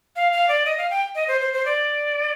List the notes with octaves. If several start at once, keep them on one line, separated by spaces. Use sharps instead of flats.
F5
F5
D5
D#5
F5
G5
D#5
C5
C5
C5
D5